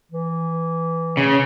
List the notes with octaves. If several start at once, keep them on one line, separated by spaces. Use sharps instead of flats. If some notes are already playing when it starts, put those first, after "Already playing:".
E3
C#3